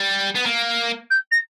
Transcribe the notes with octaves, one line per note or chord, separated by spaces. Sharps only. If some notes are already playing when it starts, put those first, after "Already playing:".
Already playing: G3
B3
A#3
G6
A#6